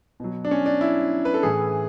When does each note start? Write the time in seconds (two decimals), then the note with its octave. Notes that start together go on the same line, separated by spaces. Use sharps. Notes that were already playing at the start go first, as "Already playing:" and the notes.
0.20 B2 F#3
0.45 D4
0.51 C#4
0.66 D4
0.81 E4
1.25 B4
1.34 A4
1.43 A2 E3 G#4